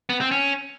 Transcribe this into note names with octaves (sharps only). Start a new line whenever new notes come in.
B3
C4
C#4